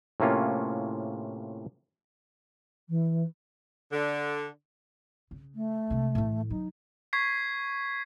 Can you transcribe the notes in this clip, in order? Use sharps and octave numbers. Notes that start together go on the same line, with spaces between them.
A2 C3 A#3 C#4 F4
E3
D3
C#3
A3
C3 G#3
A2 E3
F#3 D#4
C#6 G#6 B6 C7